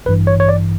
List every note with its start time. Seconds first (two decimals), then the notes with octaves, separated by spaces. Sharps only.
0.06 A1 G2 E3 B4
0.27 C#5
0.40 C#5
0.49 D5